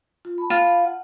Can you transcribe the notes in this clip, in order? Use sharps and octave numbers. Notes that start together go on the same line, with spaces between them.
F4
A5 B5
F4
F#5